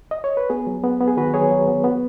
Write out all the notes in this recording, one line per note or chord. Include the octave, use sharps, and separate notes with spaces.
D#5
C#5
B4
B3 G#4
F#3
B3
B3
G#4
D#3 F#4 B4
F#3 G#4 C#5
F#3
B3
B3